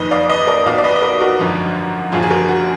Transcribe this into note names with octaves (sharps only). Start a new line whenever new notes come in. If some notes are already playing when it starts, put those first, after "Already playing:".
Already playing: F#1 F2 D#3 B4 D#5
D5 F5
B4 D#5
A#4 D5
B1 B2 D5 F5
D5
B4 D#5
D#5
A#4 D5
F#4 A#4
G#1 F#2 D3 F3
F#1 F#2 D3 F3 F4 G#4
G#4
F#4 A#4
F#4